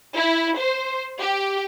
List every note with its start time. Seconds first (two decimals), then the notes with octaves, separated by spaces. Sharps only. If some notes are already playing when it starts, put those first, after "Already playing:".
0.17 E4
0.58 C5
1.19 G4